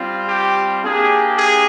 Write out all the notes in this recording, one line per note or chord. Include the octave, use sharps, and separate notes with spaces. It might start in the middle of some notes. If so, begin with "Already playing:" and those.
Already playing: G3 C4 F4
G4
A#3 D4 G4 G#4
G#4